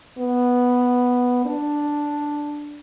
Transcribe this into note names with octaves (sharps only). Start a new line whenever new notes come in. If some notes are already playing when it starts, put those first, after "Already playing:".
B3
D4